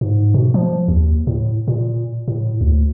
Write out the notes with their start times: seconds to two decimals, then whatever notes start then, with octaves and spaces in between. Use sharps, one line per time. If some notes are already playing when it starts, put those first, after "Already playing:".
0.01 G#2
0.34 B2
0.54 F3
0.88 D#2
1.27 A2
1.68 A#2
2.28 A2
2.61 D2